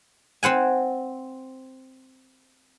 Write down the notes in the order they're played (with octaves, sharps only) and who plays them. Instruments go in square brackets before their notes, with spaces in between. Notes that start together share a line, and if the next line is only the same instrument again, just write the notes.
[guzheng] C4 C5 F#5 G#5